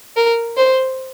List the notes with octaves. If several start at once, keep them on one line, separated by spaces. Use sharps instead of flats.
A#4
C5